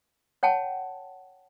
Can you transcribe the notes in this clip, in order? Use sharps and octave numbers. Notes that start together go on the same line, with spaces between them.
C#5 F#5 G5 A5